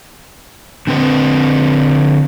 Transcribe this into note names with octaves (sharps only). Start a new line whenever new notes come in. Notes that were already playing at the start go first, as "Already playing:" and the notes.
D3 C4 B4